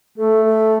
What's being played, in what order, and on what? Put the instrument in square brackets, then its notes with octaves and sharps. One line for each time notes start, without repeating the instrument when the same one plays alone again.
[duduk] A3 [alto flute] A4
[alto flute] A4